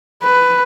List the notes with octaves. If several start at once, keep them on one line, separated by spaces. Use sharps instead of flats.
B4